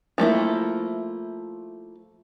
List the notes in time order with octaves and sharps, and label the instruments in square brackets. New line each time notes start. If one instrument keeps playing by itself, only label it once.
[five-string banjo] F3 A3 A#3 E4